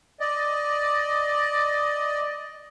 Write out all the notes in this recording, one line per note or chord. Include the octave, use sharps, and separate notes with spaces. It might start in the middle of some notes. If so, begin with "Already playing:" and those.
D5 D#5